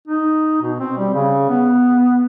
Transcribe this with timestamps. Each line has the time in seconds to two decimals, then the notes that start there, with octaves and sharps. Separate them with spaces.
0.07 D#4
0.62 B2
0.80 C4
0.98 G3
1.14 C#3
1.49 B3